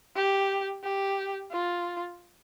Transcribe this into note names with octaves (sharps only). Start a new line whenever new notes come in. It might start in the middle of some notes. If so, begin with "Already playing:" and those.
G4
G4
F4